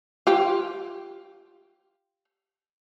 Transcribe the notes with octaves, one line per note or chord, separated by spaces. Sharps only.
F4 G4